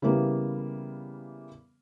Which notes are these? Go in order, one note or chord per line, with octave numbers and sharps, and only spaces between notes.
C#3 E3 G3 A#3 B3